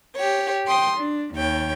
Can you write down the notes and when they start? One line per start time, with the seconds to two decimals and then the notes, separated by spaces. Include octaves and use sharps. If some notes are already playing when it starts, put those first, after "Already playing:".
0.16 G4 C#5
0.66 G5 C6 D#6
0.97 D4
1.34 D#2 C#5 G5